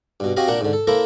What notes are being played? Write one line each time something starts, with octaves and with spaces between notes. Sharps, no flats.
G2 B2
C4 F#4 G4 D#5 F5 G#5
A#2 D4 A#4 F#5
G#2 D3
A4
A#3 E4 A4 A#4 C5